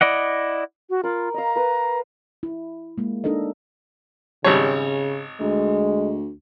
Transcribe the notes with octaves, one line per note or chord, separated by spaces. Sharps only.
E4 D5 D#5 F#5
F#4
F4 A#4 B5
D#5 F5 A#5
A#4 B4
E4
G#3 A#3
D4 D#4 A4 A#4 D#5
G#1 C#3 G3 C#5
D2 G#3